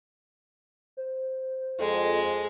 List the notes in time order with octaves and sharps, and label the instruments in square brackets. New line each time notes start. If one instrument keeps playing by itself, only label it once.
[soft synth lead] C5
[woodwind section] F2 [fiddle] G#3